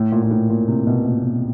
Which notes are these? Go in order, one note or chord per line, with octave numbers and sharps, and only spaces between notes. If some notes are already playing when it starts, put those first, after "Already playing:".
Already playing: A2
A#2
A#2
A2
A#2
C3
B2
A#2
B2